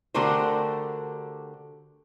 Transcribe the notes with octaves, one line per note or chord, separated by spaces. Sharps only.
D3 A3 F#4 G4 A#4 C5